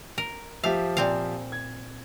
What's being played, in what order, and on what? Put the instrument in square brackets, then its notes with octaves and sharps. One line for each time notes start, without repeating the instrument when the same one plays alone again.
[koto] A#4
[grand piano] F3 G4 E5 [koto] F5
[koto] A#2 C4 F5
[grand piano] G#6